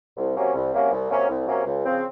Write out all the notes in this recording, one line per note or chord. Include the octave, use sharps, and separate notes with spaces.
C2
C3 F#3 A#3 C#4
C2
C3 F#3 A#3 C#4
C2
C3 F#3 A#3 C#4
C2
C3 F#3 A#3 C#4
C#2
C#3 F3 C4